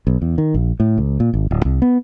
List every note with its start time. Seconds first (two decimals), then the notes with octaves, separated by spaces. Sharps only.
0.07 B1
0.22 E2
0.38 D#3
0.54 A#1
0.80 A2
0.98 C#2
1.20 A#2
1.34 G#1
1.51 D1
1.65 C2
1.82 B3